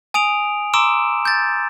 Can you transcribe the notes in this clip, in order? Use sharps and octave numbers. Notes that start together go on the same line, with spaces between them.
G#5 D#6 D7 F7
A#5 C6 D6 E6 D7 E7
G6 A6